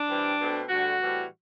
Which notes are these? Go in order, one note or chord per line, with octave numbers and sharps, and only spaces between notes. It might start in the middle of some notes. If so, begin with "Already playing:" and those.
Already playing: D4
G2 E3 G3 C4
B2 A3 C4
D2 D3 G3 F#4
A2 E3 G3 C4